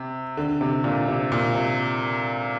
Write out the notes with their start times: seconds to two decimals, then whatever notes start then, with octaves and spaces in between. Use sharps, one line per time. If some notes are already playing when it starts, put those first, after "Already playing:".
Already playing: C3
0.37 D3
0.61 C3
0.84 A#2
1.08 C3
1.32 A#2
1.55 C3